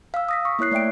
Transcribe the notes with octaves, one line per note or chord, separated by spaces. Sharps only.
F5 E6
D#6 A#6 B6
C#6
A#3 E4 C#5 F#6 C7
A3 D5 E5 G5 D7